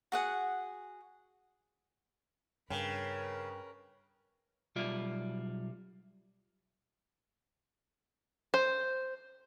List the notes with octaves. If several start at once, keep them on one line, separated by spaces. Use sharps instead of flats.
F#4 G#4 F#5
G2 C#3 A#4 B4 C#5 G5
B1 G3 F4 D5 E5
C5